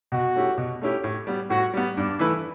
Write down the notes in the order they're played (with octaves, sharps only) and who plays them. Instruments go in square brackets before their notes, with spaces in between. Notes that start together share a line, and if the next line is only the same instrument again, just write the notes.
[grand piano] B2 [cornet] F#4
[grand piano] A3 C#4 E4 G4
B2
A3 C#4 E4 G4
A2
G3 B3
[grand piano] A2 [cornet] F#4
[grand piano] G3 B3
[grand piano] G2 [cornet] D4
[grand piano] E3 A3 E4 B4